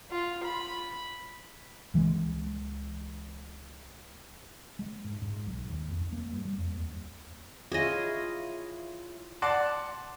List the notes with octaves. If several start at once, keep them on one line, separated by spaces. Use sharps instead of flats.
F4
B5
C#2 E3 F3 G#3
G#3
G#2
G#2
B1
D#2
F2
A#3
G2
G3
F2
D#2
E4 F4 G#4 C#5 D#5
D5 F#5 A5 C6 D6